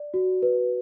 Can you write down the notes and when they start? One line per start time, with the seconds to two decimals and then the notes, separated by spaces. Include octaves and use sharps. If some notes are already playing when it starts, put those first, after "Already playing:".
Already playing: D5
0.14 F#4
0.42 B4